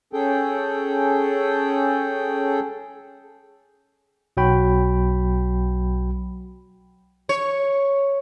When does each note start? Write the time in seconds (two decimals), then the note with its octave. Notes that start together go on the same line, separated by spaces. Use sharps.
0.13 C#4 G#4 A4 G5
4.37 B1 F#3 F#4 G5 B5
7.29 C#5